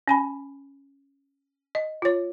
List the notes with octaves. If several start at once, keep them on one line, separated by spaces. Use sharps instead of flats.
C#4 G#5 B5
D#5
F4 C#5